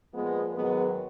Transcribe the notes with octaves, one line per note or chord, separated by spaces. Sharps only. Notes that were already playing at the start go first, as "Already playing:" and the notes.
A#2 F3 G#3 B3
G#2 D#3 F#3 G#3 B3